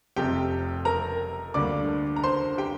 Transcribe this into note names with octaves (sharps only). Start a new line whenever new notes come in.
F1 F2 C3 G4 G5
A#4 A#5
D2 D3 G3 A#3 D5 D6
A#5
C5 C6
G4 G5